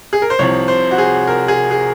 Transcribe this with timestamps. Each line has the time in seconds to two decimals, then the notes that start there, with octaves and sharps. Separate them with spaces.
0.13 G#4
0.22 A#4
0.30 C5
0.39 C2 C3 F3 C#5
0.68 C5
0.91 F#4
0.98 G#4
1.27 A#4
1.48 G#4
1.71 G#4